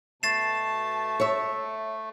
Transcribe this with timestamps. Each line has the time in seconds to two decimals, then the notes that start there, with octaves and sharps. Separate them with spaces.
0.23 B2 A3 A5 A6 C7 E7
1.20 C#5 E5